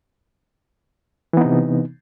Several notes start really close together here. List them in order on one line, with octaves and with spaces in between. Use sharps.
E3 B3 D#4 C3